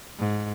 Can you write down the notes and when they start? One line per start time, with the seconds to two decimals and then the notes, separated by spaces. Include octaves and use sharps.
0.19 G#2